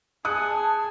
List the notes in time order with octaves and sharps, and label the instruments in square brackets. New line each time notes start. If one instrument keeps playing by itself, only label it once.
[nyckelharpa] G#4 G#5 [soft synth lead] A5 [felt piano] D#6 F#6 C#7